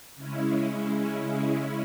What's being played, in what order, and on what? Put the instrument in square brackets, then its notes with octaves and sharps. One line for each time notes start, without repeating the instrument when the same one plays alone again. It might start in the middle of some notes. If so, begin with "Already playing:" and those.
[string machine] C#3 G#3 C#4 E4